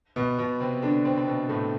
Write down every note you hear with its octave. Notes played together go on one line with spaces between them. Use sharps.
B2 B3
B2 B3
C3 C4
D3 D4
C3 C4
C4
B2 B3
A2 A3